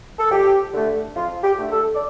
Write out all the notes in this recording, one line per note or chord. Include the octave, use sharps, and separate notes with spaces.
A4
F2 G4
D3 A3
F2 F4
G4
D3 A3
A4
D5